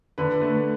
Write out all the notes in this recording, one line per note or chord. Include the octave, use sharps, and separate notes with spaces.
D3 B4
A3